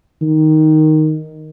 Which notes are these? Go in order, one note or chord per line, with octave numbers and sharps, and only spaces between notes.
D#3